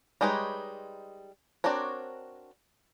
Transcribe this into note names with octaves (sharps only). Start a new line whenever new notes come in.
G3 G#3 D#4 B4 C#5
C4 D4 F#4 A#4 C#5